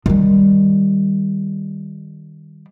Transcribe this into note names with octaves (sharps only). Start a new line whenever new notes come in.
D#3 G3